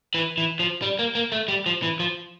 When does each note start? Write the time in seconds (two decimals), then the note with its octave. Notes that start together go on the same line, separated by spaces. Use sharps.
0.14 E3
0.37 E3
0.60 F3
0.82 G3
0.99 A#3
1.15 A#3
1.32 A3
1.48 G3
1.66 F3
1.82 E3
2.00 F3